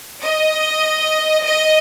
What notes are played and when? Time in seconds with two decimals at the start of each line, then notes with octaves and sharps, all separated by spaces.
0.24 D#5
1.45 D#5